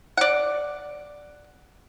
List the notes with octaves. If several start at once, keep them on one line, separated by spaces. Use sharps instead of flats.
D5 F#5